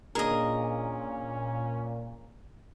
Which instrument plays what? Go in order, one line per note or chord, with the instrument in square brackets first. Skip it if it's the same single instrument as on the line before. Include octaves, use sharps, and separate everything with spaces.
[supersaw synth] A#2 [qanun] A#3 D4 G#4 [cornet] C#4 [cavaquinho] A#4 D#5